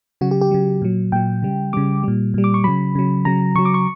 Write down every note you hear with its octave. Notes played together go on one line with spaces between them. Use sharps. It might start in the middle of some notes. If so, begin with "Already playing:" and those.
C#3 F#3 F#4
G4
G4
C#3 F#3
A#2 F#3
A#2 F#3 G5
C#3 G3
C#3 G3 D6
A#2 G3
A#2 G3
D6
C#6
C#3 F#3 B5
C#3 F#3
C#3 F#3 A#5
C#3 F#3 C#6
D6
C#6